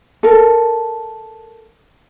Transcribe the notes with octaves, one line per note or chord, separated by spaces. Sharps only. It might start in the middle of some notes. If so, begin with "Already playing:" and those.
A4 A#4